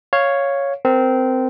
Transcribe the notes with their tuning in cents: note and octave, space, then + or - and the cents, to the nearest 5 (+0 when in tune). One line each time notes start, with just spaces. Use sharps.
C#5 +0 F5 +0
C4 -15 A#4 +0